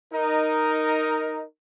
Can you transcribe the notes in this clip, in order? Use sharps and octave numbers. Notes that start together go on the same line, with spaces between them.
D#4 A#4